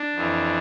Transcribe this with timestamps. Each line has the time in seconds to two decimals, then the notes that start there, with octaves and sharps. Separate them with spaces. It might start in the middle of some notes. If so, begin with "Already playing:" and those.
Already playing: D4
0.15 F2 E3